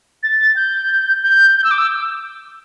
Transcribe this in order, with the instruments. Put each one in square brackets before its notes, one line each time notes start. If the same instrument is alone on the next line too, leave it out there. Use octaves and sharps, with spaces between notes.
[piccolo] A6
G6
G6
G6
E6
D6
E6